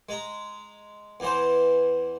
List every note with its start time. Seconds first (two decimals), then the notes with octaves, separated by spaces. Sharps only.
0.09 G#3 A#5
1.20 E2 E3 C5